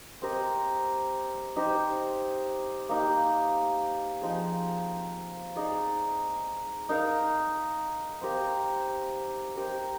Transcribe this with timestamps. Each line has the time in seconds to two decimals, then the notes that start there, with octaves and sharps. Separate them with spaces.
0.22 C4 G4 A#4 D#5
1.56 D#4 G4 C5 D#5
2.89 A#3 D#4 G4
4.22 F3 C4 D#4 G#4
5.56 D#4 G#4 D5
6.89 D#4 A#4 F5
8.21 C4 G4 A#4 F5
9.55 C4 G4 A#4 D#5